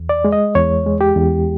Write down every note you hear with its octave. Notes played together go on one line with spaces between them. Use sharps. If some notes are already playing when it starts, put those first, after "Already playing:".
Already playing: E2
D5
G#3
D#5
E2 C#5
G#3
G4
E2